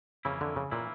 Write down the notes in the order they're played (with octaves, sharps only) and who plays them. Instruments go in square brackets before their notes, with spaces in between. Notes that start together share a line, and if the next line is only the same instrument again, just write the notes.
[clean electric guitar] F2 E3 A#3 C#4 E4 [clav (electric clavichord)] C#3
[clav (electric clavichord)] D3
C#3
[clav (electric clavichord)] A#2 [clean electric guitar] E3 A#3 C#4 E4